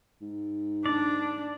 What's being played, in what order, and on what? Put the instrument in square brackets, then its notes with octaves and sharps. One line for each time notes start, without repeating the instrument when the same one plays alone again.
[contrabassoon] G#2
[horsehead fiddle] D4 [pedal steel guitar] D5